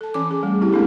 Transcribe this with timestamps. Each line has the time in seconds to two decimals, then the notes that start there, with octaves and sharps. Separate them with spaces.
0.01 A4 A5
0.14 E3 C#4 G#5 D6
0.31 G#4
0.43 G3 A3
0.61 C4 E4 G4
0.72 G#3 A#3 C4 D4 G#4 A4